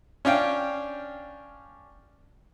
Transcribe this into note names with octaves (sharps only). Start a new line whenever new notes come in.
C#4 D4 F5 G5